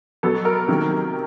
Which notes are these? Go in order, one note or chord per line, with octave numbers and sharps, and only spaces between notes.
B2 F#3 B3 A4
A#4
C3 D#3 F#3 A#3